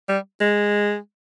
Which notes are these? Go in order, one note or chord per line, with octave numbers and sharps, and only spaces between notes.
G3
G#3